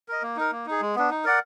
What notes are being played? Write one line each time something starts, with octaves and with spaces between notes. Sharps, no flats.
A#4 D#5
A#3
D#4 A#4
A#3
D#4 G#4
G#3
B3 D4
D#4
A#4 D5 F#5